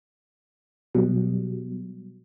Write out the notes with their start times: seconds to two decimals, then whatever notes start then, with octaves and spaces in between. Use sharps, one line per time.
0.95 B2 F#3 G3